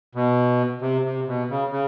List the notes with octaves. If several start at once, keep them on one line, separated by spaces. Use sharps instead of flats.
B2
C3
C3
B2
C#3
C#3